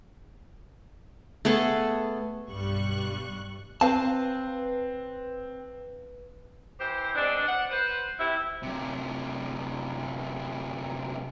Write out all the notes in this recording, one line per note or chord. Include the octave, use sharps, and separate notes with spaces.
A3 B3 G#4 A4
B1 G2 G3 C#6 F#6
C4 B4 F5 A5
E3 G4 C5
G#3 B3 C4 D4
F#5
B4 C5
C3 E4
F#2 C3